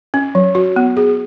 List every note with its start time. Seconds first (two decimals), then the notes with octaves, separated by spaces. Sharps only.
0.14 C#4
0.35 F#3
0.55 F#4
0.76 B3
0.97 G#4